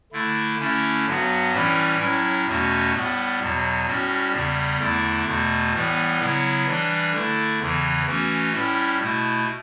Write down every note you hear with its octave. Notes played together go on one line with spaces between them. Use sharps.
D3 A3 E4
D3 A3 C#4 E4
G2 F#3 B3 F#4
A2 E3 G3 C#4 E4
A2 F#3 C#4 E4
E2 B2 A3 C#4 F#4
A2 G3 B3
E2 B2 F#3
A2 G3 C#4 F#4
E2 C#3 G3
E2 D3 A3 E4
E2 B2 A3
A2 E3 G3 B3
C#3 F#3 B3 E4
E3 G3 D4
D3 A3 E4
E2 C#3 E3
E3 A3 C#4 F#4
A2 G3 C#4 E4
B2 A3 E4